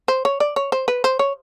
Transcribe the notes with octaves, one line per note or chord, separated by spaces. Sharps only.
C5
C#5
D5
C#5
C5
B4
C5
C#5